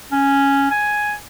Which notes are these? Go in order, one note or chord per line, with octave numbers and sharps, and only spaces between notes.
C#4
G#5